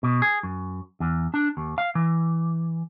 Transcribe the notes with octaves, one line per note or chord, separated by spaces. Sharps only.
B2
G#4
F#2
E2
D4
D#2
F5
E3